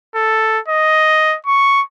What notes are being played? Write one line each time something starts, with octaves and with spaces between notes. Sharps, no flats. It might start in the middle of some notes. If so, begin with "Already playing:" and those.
A4
D#5
C#6